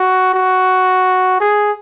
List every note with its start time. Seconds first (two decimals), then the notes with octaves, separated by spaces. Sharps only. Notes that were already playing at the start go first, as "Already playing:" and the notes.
Already playing: F#4
0.34 F#4
1.40 G#4